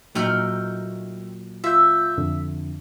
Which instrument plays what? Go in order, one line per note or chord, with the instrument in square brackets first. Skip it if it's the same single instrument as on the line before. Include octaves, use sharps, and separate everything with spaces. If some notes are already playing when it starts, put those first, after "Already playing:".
[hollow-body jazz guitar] A#2 F#3 D#4 [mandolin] A3 G5 F6
[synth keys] F4 G6 [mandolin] E5
[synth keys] F2 D3